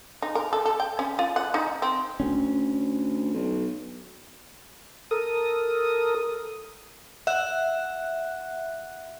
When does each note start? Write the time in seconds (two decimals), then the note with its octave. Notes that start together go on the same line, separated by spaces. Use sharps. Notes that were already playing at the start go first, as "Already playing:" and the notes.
0.22 D#4
0.35 A#4
0.53 A4
0.65 A4
0.80 G5
0.99 C#4
1.19 F4
1.36 F#5
1.54 D#4
1.82 C4
2.20 D2 C#4
3.34 B1
5.11 A4 A#4 D#6
7.27 E5 F#5 F#6